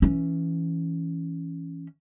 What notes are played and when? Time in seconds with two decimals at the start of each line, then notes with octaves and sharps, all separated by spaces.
0.02 E3 C#4